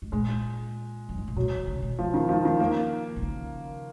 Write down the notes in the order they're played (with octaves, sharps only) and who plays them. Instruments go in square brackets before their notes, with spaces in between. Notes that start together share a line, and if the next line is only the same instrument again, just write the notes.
[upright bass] G#2
[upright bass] A#2 [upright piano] G#3
[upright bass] F#2
G#2
A#2
[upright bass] B2 [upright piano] F#3
[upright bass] D#3
C#3
B2
[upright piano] F3
D#3
F3
D#3
A#3
[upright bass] B2
C#3